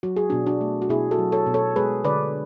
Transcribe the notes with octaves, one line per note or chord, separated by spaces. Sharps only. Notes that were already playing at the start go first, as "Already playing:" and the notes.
F#3 F#4
G#4
B2 D4 F#4
D4 F#4
A3
F#4
B2 E4 G#4
F#4 A4
F#3
A4 C#5
B2
A4 C#5
G#3 G#4 B4
D3 B4 D5